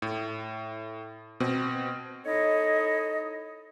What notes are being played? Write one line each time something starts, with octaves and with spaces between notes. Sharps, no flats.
A2
B2 C4
D#4 E4 A4 C#5 D#5